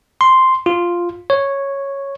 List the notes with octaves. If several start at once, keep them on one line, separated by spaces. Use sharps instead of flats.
C6
F4
C#5